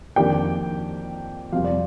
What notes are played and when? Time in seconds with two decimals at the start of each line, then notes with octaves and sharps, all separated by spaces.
0.16 F2 D#3 A#3 D4 G4 G5
1.52 F2 C3 G3 F4 F5
1.64 D5